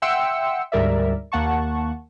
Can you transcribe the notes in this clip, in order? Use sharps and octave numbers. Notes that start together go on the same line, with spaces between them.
E5 F#5 G5 C6 E6 C#7
D2 G#2 G3 A#4 D5 E5
D#2 A#3 F#5 A5 C#6